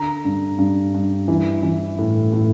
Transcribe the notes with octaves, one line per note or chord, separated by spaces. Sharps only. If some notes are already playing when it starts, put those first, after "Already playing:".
Already playing: D3 A#5
G2
G2
G2
E3
E3
A2
A2